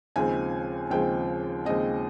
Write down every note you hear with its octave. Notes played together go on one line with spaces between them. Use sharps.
D#2 C#3 F3 G#3 C4 G#5
D#2 C#3 F3 G#3 C4 G5
D#2 C#3 F3 G#3 C4 D#5